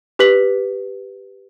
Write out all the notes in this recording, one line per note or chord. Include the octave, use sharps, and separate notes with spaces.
G4 B4 B6 F#7